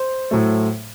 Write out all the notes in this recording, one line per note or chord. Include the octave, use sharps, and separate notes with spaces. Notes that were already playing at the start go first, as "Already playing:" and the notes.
Already playing: C5
A2 F#3 A3